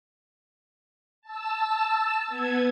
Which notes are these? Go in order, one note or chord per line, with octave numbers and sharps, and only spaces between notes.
A5 E6
B3 G#6